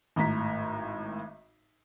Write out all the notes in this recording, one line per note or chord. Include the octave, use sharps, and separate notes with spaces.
G#1 A2 A#5 B6